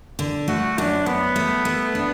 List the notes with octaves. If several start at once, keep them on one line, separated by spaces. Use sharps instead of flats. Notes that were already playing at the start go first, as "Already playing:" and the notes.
D3
A3 F#4
F#2 D4
F#2 B3
A3
A3
D4